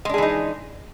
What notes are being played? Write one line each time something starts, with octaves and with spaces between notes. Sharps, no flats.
E3 G#3 D4 D#4 G#4